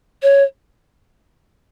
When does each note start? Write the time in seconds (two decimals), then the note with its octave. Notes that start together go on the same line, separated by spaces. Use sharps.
0.23 C#5